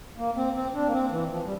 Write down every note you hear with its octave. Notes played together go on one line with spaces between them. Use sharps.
A#3
C4
C4
D4
A#3
C4
E3
F3
G3